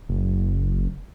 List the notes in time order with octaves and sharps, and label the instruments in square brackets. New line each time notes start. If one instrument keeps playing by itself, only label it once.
[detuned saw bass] F#1